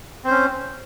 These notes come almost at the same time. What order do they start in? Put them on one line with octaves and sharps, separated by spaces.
C4 C5 C#4